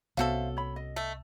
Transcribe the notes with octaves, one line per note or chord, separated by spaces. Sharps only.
C2 B3 C#4 F#4 A4 C5 E5 F5
C#5 B5
D#5
A3